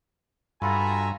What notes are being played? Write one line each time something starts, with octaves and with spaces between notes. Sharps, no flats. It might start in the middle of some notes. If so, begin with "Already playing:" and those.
G2 F4 F#4 A4 E5 G#5 A#5 B5